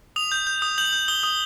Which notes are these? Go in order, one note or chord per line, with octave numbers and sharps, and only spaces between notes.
D#6 F7
G6
G6
D#6
G6 F#7
G6
D#6 G7
D#6